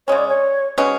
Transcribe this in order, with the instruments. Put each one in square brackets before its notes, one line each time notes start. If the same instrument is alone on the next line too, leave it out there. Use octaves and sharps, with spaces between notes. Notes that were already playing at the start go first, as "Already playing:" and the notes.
[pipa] C#3 G#3 C#4 [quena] C#5
[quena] D5
C#5
[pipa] B2 G#3 C#4